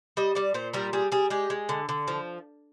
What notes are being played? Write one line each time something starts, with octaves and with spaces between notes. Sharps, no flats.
G3 D#5
G3 D5
A#2 C5
G3 A#4
G3 G#4
G3 G#4
G#3 G4
G#3
D3
D3
F3